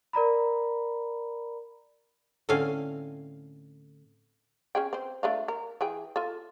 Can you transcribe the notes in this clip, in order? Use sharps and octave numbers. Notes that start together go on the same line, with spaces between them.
A#4 D5 A#5 B5
A2 D3 C4 C#4 F5 G#5
C#4 G#4 G5
C4 C5
A3 D4 F4
A#4
E3 G#4 G5
F4 A4